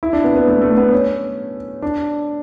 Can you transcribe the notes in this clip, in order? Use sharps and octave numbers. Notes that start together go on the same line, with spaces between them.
E4
D4
B3
B3
A3
A3
B3
C#4
D4